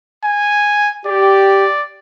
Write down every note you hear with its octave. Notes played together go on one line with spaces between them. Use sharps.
G#5
G4 D5